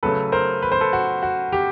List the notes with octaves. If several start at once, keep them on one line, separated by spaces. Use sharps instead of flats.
C#3 F#3 A3 A4 B4
A#4 C5
B4
C5
A4 B4
F#4
F#4
G4